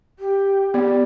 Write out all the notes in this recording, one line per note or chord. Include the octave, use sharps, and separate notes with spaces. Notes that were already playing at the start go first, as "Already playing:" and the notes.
G4
G3 B3